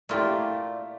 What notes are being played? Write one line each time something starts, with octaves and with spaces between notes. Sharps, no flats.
A#2 A3 A#3 E4 F4 G4